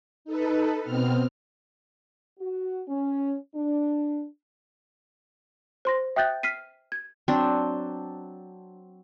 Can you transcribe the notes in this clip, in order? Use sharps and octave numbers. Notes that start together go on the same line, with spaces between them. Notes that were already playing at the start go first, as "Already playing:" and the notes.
D#4 A4 B4
B2 B3 C4 F6
F#4
C#4
D4
C5 C6 A#6
E5 G5 D#6 F#6 G6 A6
F6 B6 C7 D#7
G#6
F#3 C4 D4